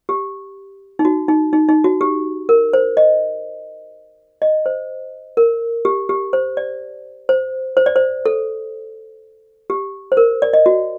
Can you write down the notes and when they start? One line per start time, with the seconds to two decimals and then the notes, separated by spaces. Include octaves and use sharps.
0.09 G4
0.99 D#4
1.05 F#4
1.28 D#4
1.53 D#4
1.69 D#4
1.84 F#4
2.01 G4
2.49 A#4
2.73 C5
2.97 D#5
4.42 D#5
4.66 C5
5.37 A#4
5.85 G4
6.09 G4
6.33 C5
6.57 D5
7.29 C5
7.77 C5
7.86 D5
7.96 C5
8.26 A4
9.70 G4
10.12 C5
10.17 A#4
10.42 D5
10.53 D#5
10.66 F#4